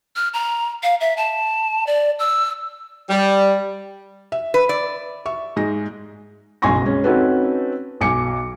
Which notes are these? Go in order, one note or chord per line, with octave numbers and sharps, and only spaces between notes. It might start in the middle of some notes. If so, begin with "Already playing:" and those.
F6
A#5
F5
E5
A5
D5
E6
G3
E5
B4
D5
E5 C#6
G#2 G#3 A#6
F#1 B1 G#5 C6 C#6 A#6
G#3 C#4
C4 C#4 D#4 F#4 A4 B4
B1 G#5 D6 C#7